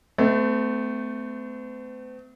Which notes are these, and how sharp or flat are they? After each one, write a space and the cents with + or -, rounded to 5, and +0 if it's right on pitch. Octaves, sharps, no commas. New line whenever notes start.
A3 +0 C4 -45